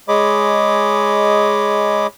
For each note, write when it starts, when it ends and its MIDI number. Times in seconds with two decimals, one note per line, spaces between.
0.08 2.07 56
0.08 2.07 68
0.08 2.07 73
0.08 2.07 75
0.08 2.07 83
0.08 2.07 86